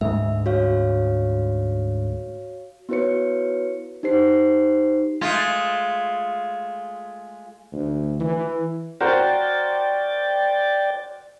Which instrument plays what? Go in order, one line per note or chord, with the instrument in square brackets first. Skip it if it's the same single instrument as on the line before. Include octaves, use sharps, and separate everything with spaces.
[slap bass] D2 G#2 G#3 [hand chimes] E5
[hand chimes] F#4 C#5 F5
B3 E4 F#4 B4 C#5 C#7
D#4 G4 C5 C7
[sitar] G#3 A3 F4
[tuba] D2
E3
[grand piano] F#4 A#4 C5 [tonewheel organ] D5 G5 A6